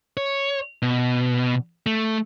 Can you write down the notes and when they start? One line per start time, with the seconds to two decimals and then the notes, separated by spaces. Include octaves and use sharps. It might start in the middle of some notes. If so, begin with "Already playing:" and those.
0.17 C#5
0.82 B2
1.86 A3